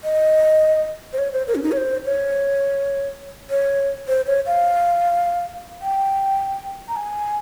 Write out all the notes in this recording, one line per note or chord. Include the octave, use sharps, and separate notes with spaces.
D#5
C5
C#5
C5
A#4
C#4
D#4
C#5
C5
C#5
C#5
C5
C#5
F5
G5
A#5
G#5